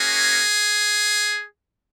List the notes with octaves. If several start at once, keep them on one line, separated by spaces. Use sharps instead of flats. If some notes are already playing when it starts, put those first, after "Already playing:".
Already playing: A#3 C#4 F#4 G#4